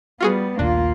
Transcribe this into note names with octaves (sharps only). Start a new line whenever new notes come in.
G3 B3 F4 F#4 G#4
D#1 A#1 D#2 A#3 D4 F4